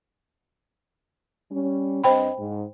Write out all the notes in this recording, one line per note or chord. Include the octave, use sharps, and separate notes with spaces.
G3 C#4
G2 C4 C5 D#5 G5 B5
G#2